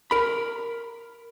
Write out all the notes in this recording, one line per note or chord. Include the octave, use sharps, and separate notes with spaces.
A#4 B5